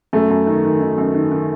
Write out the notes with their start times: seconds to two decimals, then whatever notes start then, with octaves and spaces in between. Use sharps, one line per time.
0.13 F#2 A3
0.30 F#2
0.47 D#3
0.64 D#3
0.81 D#3
0.98 F#2
1.14 D#3
1.31 D#3